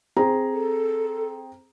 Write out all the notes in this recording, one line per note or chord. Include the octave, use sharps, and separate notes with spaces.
C4 G#4 A#5
A4